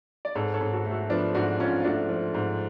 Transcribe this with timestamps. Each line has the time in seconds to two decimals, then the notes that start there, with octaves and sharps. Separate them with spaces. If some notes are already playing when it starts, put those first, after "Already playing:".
0.25 D5
0.35 G#2 A4 C#5
0.54 A4 C#5
0.61 G#2
0.73 F#4 A4
0.85 A3
0.91 F#4 A4
1.10 F3 B3 D4
1.34 G#2 D4 F#4
1.60 G#2 C#4 F4
1.80 F4
1.84 A3 D4 F#4
2.09 F3
2.34 G#2